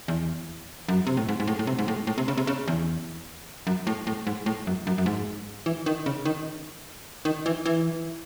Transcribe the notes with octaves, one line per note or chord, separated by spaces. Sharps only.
E2
F#2
C3
A2
G#2
G#2
A2
A2
C3
G#2
A2
A2
C3
C#3
C3
C#3
E2
F#2
A2
A2
G#2
A2
F#2
F#2
F#2
G#2
E3
D#3
C#3
D#3
D#3
E3
E3